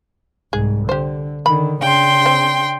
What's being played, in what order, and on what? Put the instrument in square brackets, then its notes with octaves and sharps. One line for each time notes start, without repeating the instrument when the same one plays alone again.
[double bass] C2 G#2 [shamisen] G#4
[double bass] D3 [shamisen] G4 C5
[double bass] D3 D#3 [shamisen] B5
[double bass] C#3 D4 [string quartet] G5 C6
[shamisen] C4